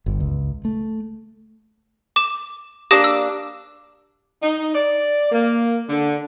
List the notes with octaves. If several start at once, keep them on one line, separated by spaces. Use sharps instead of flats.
G1 G2
C#2
A3
D6 E7
A#3 D4 G4 D#6 A#6
E6
D#4
D5
A#3
D3